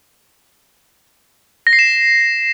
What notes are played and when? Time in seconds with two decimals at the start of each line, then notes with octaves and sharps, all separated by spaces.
1.67 A#6
1.73 C7
1.79 E7